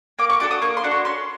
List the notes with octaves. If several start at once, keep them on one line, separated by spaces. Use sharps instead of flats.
A#3 D6
C#6
D4 F#4 A4 D6
D#6
A#3 C#6
C6
D4 F#4 A4
C#6
C#4 C6